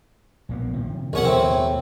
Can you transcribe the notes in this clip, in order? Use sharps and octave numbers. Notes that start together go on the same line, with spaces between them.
A#1 A#3 B3
C3 D#3 F3
A#1 D#2 B2 D#3 C#4 F#5
A2 C4